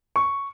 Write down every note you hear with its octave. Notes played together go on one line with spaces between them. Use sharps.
C#6